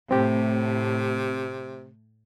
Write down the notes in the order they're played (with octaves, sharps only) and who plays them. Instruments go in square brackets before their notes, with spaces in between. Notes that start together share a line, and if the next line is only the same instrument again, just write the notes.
[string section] A2 [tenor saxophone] C3 [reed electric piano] C4 G4